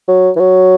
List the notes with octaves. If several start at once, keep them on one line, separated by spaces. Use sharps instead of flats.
F#3
E3
F#3